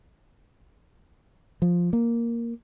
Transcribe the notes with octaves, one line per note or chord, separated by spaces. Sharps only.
F3
A#3